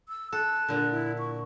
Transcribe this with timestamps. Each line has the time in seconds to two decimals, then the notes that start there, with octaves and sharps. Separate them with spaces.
0.09 E6
0.33 A4 F#6
0.68 A#2 D3
0.91 E4
1.19 C#6